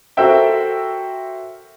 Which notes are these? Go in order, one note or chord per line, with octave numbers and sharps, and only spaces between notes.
F#4 A4 A#4 C5 E5 G5